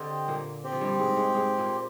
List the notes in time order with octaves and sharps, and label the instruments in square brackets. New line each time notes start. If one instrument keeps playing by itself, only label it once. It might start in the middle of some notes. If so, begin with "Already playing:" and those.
Already playing: [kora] D3 [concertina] C4 G4 C5 D#5
[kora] A#2 A#3
[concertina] C4 G4 C5
[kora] F3
G2 G3
G#2 G#3
G#2 G#3
G#2 G#3
A#2 A#3